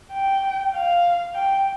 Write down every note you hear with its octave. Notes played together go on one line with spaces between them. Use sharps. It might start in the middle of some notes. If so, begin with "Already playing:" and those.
G5
F5
G5